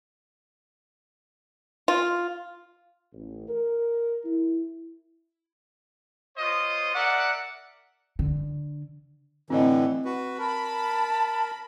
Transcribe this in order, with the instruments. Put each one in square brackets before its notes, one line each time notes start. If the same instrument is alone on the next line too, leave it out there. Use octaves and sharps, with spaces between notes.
[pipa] F4
[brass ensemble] A1
A#4
E4
[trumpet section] F4 C5 C#5 D#5
A#4 D5 E5 F#5
[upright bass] D3
[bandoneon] A2 D3 E3 [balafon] C4 D#5
[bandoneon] F#4 B4
[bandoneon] A#4 [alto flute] A5 [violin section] B5